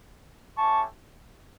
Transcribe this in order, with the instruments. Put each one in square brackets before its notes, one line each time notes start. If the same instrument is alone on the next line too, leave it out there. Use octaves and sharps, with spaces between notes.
[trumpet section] A3 C#4 E4 G4 A5 C#6